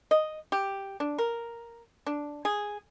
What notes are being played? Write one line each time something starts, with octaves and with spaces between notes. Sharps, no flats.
D#5
G4
D4
A#4
D4
G#4